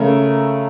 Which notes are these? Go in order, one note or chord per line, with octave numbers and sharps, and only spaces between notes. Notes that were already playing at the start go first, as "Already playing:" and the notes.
Already playing: C#3 A3 C#4 A#4